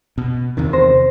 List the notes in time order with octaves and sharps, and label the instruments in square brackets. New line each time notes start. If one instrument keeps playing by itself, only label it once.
[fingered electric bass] B2
E2 C3 D#3
[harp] C5 A#6